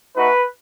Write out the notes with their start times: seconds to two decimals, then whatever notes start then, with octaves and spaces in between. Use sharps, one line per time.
0.16 A3 D#4 F#4 B4